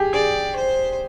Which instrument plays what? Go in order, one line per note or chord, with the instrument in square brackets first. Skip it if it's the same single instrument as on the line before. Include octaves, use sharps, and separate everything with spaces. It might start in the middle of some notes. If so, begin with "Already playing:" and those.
Already playing: [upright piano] G4 G#4
[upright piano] G#4 [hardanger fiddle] D5
[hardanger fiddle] C5